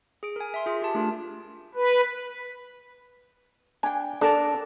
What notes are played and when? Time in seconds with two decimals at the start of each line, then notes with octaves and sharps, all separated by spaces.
0.23 G#4 D7
0.36 A#4 G#5
0.54 E5 C6
0.66 F4 G#4
0.82 G4 A5
0.95 A3 D4 F4 A#4
1.75 B4
3.83 D4 G5 G#5
4.21 D4 A4 A#4 D5